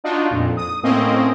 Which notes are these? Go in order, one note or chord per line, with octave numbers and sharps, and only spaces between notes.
D4 D#4 F4 F#4
F2 A#2
D#6
A2 A#3 C4 C#4 D#5